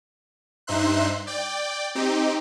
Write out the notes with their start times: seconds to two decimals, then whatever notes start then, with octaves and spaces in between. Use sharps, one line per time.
0.67 G2 D#4 C5 E5 C6 F#6
1.27 D5 G5
1.95 C4 D#4 G4